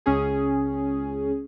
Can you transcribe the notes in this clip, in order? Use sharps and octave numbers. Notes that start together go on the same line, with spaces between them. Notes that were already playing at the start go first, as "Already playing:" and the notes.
C#2 C#4 G#4